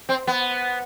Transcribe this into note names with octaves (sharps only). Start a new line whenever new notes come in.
C4
B3